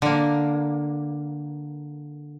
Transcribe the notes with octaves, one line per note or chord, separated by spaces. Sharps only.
D3 A#3